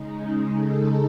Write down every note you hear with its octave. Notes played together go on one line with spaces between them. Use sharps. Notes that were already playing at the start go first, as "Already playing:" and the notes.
Already playing: C#3 G#3 D#4
A4